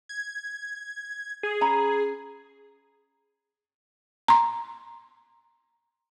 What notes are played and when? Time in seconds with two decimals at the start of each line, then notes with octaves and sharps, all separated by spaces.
0.09 G#6
1.43 G#4
1.61 C#4 A#5 B5
4.28 A#5 C6